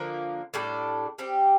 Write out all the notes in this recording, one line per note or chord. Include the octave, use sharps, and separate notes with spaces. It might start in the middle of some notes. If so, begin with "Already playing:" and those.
Already playing: D3 F3 A#3
A2 G3 D4 A4
G3 C4 G4